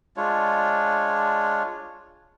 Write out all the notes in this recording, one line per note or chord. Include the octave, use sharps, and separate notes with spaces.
G#3 D4 F4 C#5